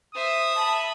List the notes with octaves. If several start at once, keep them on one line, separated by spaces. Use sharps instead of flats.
C5 E5 D#6
E5 A5 B5